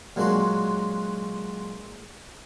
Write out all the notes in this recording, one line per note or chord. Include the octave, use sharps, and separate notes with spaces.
A#2 F#3 G#3 D4 F#4 C6